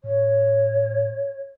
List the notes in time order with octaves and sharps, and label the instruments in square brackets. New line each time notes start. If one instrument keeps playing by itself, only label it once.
[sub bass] A2 [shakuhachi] C#5